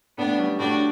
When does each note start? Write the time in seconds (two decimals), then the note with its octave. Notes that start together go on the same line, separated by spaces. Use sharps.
0.18 A2 B3 D4
0.39 G3 C#4
0.59 A2 D4 F#4